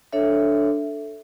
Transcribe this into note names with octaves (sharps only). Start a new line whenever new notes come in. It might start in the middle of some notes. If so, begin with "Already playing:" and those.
D4 A4 C#5 E5